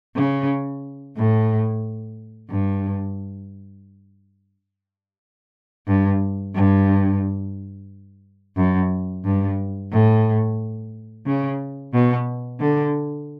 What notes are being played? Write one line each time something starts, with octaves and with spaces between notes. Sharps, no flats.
C#3
A2
G2
G2
G2
F#2
G2
A2
C#3
B2
D3